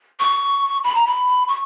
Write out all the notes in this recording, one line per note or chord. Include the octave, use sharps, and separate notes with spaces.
C#6
B5
A#5
B5
C#6